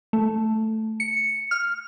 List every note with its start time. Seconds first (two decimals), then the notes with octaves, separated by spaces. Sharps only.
0.13 A3
1.00 C#7
1.51 F6